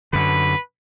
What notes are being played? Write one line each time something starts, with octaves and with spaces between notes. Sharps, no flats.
F#2 D3 B4